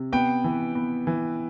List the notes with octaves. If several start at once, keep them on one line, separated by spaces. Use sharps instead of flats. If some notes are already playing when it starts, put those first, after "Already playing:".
Already playing: C3
B3 G5
E3
B3
E3